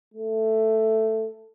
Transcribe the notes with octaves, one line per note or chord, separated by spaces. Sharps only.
A3